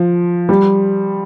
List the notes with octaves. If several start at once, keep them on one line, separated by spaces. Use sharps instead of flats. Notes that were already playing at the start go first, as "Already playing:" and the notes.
Already playing: F3
G3